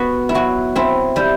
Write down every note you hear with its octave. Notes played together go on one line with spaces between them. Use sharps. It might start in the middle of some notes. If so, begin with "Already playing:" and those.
Already playing: B3 F#4
E4
F#3 F#4
C4 E4
G3 E4